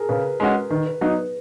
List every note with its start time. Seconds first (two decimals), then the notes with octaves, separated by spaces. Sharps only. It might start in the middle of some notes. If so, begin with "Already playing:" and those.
Already playing: G#4 A#4
0.09 C#3 B4
0.40 G#3 C#4 F#4
0.70 D#3 B4
0.86 B4
1.01 F#3 B3 D#4 B4
1.18 B4